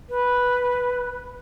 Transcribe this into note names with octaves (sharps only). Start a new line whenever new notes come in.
B4